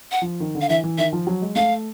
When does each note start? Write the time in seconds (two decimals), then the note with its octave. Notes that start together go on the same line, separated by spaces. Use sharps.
0.11 F#5
0.22 F3
0.40 D#3
0.55 D3
0.61 F5
0.69 E3 E5
0.84 E3
0.98 D#3 E5
1.13 F3
1.27 F#3
1.42 G#3
1.56 A3 F5